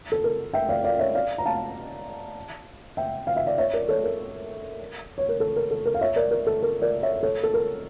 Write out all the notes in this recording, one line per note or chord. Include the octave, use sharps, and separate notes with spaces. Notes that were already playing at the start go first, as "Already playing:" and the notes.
A4
A#4
E5 G5
D5 F5
D5 F5
C#5 E5
D5 F5
A#5
F5 A5
E5 G5
F5
E5
D5 F5
C#5 E5
A#4 D5
A4 C#5
A#4
C#5
A#4
A4
A#4
A4
A#4
F5
C#5 E5
A#4 D5
A#4
A4
A#4
A#4 D5
C#5 E5
A4 C#5
A4
A#4